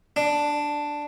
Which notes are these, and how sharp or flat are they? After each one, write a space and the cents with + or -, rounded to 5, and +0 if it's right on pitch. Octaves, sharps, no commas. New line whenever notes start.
D4 +0